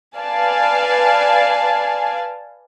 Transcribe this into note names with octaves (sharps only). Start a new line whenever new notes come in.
B4 D5 F5 G#5 A5